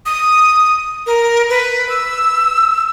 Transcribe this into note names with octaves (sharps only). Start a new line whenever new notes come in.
D#6
A#4
B4
E6